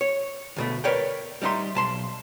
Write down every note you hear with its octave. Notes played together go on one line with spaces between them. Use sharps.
C#5
D2 B2 A3
A#4 B4 C#5 D5 G5
G3 A3 D#4 E5 C6
B1 A5 C6